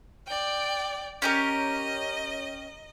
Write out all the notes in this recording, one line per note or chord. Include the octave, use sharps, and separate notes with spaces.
D5 G5
C#4 G4 A#4 D#5